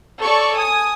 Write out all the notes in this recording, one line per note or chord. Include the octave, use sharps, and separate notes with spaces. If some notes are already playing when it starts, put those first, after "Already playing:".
A4 C#5 D5 C#6
G#5 D#6